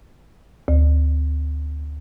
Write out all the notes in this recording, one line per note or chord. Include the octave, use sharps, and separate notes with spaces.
D2